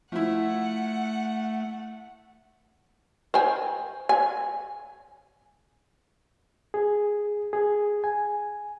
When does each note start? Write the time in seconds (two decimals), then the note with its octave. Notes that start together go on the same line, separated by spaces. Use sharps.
0.12 F3 A3 E4 F#5
3.34 C5 G5 G#5
4.09 G#5
6.74 G#4
7.53 G#4
8.04 G#5